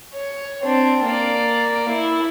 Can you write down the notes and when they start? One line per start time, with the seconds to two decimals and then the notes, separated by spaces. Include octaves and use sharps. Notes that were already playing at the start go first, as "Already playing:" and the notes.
0.14 C#5
0.63 C4 D4
1.04 A#3 D5
1.89 E4